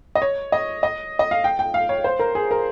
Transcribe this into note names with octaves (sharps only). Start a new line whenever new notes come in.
D#5
C#5
D#5
D#5
D#5
F5
G5
G5
F5
C#5
C5
A#4
G#4
A#4